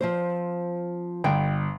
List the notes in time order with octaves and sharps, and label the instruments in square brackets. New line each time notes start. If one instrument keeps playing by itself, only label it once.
[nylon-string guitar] F3 C4 C5
[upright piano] G1 [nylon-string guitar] G5